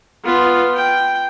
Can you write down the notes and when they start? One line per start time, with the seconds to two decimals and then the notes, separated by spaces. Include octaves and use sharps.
0.25 B3 F4
0.74 G5